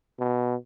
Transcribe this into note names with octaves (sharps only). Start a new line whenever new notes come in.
B2